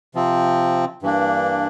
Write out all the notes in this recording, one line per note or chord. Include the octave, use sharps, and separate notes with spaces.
C3 F3 C4
G2 E3 A#3 D4